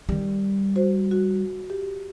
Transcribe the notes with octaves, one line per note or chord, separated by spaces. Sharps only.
D#3 G3
F#4 C5
F#4
G4